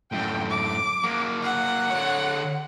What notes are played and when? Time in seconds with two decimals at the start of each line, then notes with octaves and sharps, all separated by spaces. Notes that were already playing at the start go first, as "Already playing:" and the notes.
0.12 F#2 A2 G5
0.50 D6
1.04 F#3 A#3
1.43 F#5
1.90 D3 C#5